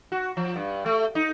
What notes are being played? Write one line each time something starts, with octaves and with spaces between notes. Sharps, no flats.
F#4
F3
G2
A3
D#4